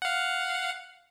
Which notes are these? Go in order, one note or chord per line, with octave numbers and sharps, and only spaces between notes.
F5 F#5